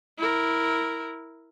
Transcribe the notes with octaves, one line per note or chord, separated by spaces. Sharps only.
E4 A#4